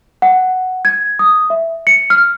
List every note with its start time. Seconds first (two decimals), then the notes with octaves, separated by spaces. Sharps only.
0.22 F#5
0.85 G#6
1.19 D#6
1.50 E5
1.87 C#7
2.10 F6